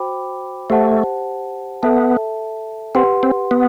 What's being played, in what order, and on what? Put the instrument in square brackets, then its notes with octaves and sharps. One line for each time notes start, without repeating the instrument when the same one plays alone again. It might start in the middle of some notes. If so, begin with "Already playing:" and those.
Already playing: [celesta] F#4 C5 G5 B5 D6
[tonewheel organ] A3 [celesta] G4 C5 F#5 A5
[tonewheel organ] B3 [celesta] A4 E5 A5
[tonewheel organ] C4 [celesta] G4 B4 F#5 C6
[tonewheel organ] C4
B3